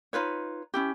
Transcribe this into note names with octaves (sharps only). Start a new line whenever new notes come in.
D#4 F4 B4 C#5
C#4 E4 G4